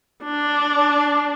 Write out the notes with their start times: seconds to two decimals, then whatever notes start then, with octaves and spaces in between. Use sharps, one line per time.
0.24 D4